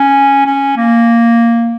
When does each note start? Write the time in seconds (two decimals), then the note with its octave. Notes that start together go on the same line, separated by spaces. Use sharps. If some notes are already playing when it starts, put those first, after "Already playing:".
Already playing: C#4
0.46 C#4
0.77 A#3